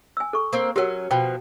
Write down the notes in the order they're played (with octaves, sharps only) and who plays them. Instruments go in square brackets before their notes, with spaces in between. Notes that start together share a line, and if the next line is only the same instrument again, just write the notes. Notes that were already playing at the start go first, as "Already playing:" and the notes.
[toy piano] G#5 E6
A4 C#6
[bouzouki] A#3 C4
[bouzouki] F#3 C#4 [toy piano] G4 A#4 F#5
[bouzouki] B2 F3 [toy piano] G5